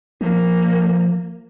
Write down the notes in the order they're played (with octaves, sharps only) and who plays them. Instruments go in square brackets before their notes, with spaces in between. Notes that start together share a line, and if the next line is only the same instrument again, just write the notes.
[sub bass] F3 [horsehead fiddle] A#3